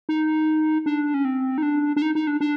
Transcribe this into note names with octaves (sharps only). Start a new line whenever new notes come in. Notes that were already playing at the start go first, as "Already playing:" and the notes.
D#4
D4
C#4
C4
D#4
D4
D4
D#4
D#4
D4
D4